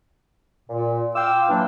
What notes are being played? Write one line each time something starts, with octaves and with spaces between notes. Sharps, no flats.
A#2
F4 F5 G5 D6 E6
E3 F#3 A#3 D4